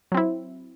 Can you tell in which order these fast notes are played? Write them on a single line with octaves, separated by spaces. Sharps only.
F#3 C4 E4